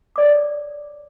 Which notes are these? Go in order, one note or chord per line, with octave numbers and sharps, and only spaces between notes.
C#5 D5 D6